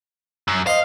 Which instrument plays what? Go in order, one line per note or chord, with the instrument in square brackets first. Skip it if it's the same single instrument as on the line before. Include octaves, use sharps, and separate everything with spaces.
[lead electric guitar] F#2
[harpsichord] C5 D#5 [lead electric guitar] F5